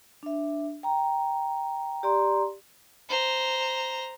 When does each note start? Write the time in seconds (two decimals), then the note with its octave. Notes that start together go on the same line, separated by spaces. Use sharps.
0.23 D4 E5
0.83 G5 A#5
2.03 G4 D5 A#5 C6
3.10 C5 A#5